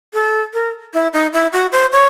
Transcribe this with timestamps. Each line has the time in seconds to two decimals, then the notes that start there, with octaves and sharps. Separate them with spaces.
0.14 A4
0.54 A#4
0.94 E4
1.13 D#4
1.33 E4
1.53 F#4
1.72 C5
1.92 C#5